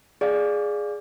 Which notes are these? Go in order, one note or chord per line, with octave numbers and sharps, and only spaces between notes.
G#4 D5 F5